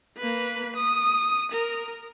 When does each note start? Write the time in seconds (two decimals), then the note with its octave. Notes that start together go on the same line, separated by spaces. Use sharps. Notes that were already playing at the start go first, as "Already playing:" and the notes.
0.18 A#3 B4
0.76 D#6
1.52 A#4